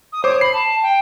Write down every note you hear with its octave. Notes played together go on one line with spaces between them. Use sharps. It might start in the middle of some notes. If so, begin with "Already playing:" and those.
D#6
C5 C#5 D6 D#6
B5 C7
A5
G5